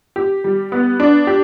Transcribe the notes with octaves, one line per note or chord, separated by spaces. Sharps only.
G4
G3
B3
D4
G4